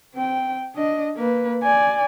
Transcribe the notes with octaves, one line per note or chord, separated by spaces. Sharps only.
C4 G5
D4 D#5
A#3 B4
D5 G#5